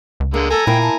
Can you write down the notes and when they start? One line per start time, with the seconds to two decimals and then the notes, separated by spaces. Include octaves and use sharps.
0.20 C#2
0.34 D3 G#3 A#3
0.50 A4 G#5 A#5
0.67 A#2 A#3 E4 G5
0.83 A5